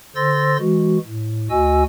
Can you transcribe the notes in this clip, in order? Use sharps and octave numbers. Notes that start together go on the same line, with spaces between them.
D3 C5 C6 E6 A6 A#6
E3 G#3 F#4
A2
D2 F#4 D#5 G#5 E6